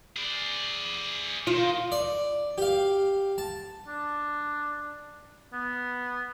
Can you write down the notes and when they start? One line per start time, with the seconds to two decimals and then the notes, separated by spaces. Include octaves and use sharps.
0.16 G#4 D5
1.47 D#3 F4
1.92 D5
2.58 G4 F5
3.38 A5
3.88 D4
5.53 B3